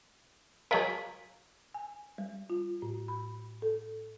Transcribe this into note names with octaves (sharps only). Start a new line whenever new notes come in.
F#3 G#4 A#4 D#5 F5 A5
G#5
G3
F4
A2
B5
A4